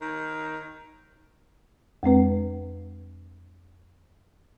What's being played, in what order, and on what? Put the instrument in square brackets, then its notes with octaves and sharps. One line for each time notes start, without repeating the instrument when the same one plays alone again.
[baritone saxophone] D#3
[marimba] F2 G#3 C4 B4